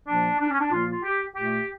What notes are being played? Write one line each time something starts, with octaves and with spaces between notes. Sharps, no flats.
A#2 F3 A#3 D4
D4
C#4
D4
A#2 F3 A#3 F4
F4
G4
A#2 A3 G4